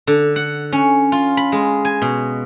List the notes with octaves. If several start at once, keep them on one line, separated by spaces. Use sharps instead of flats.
D3
F#5
C#4
F4
B5
G#3
G#5
B2